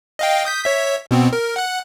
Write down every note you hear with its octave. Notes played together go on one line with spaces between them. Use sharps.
D#5 F5 G5
D#6 G6 B6
C#5 E5 B6
B2 B3 C4
A#4
F#5 F#6